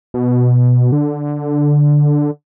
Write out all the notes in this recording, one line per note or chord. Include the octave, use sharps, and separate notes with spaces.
B2
D3